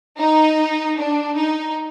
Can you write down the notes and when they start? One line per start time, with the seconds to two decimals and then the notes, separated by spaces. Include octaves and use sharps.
0.20 D#4
0.98 D4
1.37 D#4